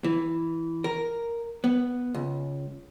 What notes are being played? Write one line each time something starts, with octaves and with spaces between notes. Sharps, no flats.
E3
A#4
B3
C#2